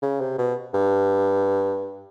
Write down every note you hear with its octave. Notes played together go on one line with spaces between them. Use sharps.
C#3
C3
B2
G2